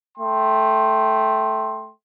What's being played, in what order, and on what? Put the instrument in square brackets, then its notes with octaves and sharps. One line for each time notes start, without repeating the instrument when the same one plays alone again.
[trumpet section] A3 G5 C6